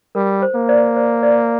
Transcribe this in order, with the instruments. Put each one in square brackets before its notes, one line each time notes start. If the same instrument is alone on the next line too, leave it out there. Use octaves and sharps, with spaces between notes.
[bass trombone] G3 [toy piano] A#4
[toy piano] C5
[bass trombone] A#3
[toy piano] C5 D5
C5 D5
C5 D5